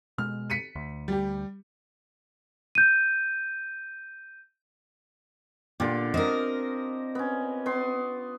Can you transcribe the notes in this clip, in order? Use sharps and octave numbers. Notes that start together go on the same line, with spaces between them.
B2 G#3 F6
B6 C#7 D#7
D2
G3 G4
G6 D#7
A#2 D3 F4 G4
C4 A#4 D#5
B3 C#4
B3 C6